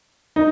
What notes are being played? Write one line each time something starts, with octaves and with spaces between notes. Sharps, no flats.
D#4